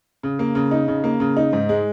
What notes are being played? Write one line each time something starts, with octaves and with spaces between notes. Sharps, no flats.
C#3
A#3
C#3
D#4
C#3
A#3
C#3
D#4
G#2
G#3